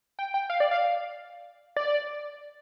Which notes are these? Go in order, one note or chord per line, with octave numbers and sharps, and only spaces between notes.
G5
G5
F5
D5
F5
D5